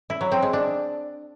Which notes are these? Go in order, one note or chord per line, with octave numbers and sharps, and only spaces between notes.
E4
F#3
C4
G#3
D4